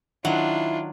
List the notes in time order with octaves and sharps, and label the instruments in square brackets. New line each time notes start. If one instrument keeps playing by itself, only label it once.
[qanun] D#3 F#5 [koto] F#3 [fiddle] D4 F4 [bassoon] E4